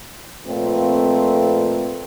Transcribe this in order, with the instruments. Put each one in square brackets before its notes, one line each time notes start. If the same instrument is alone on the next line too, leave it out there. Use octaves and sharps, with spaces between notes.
[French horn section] F2 A#2 A3 C4 F4 B4